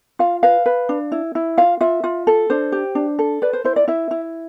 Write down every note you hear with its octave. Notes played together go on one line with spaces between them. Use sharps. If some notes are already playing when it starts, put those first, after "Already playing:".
F4 F5
B4 F5
B4
D4
E4
E4
F4 F5
F4 E5
F4
A4
D4 C5
G4
D4
A4
B4 D5
C5
E4 C5
D5
E4 E5
E4